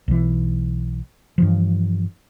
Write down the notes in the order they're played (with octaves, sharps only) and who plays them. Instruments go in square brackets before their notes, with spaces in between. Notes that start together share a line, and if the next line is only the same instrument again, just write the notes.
[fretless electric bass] B1 E3
G2 E3 F3